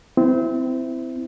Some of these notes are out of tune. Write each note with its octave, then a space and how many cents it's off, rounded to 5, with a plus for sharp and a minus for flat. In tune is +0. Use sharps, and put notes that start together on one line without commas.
C4 -25 E4 +0